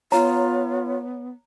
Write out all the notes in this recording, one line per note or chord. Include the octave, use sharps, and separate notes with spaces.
B3 F4 C#5 A#5